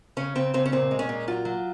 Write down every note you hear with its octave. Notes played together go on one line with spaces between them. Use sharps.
C#3 C#4
C#3 C4
C#3 C4
C#4
A#2 C4
G#3
C#4
A#2
F#3 F4
F#3